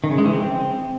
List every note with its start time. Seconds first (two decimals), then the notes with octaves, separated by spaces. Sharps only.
0.04 D#3
0.11 C#3
0.18 G#3
0.25 E3
0.33 C4